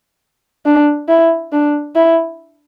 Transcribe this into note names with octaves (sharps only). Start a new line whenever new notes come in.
D4
E4
D4
E4